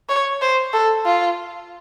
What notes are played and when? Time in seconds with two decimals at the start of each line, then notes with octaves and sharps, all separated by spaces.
0.09 C#5
0.42 C5
0.73 A4
1.06 F4